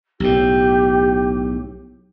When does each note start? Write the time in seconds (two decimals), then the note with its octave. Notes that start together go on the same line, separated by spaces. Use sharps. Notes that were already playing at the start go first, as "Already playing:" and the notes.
0.20 B1 A2 G4